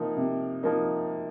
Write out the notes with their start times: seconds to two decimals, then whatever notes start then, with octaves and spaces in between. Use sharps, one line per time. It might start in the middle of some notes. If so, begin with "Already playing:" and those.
Already playing: C3 F3 A#3 D#4
0.17 C3
0.63 F3 A#3 D#4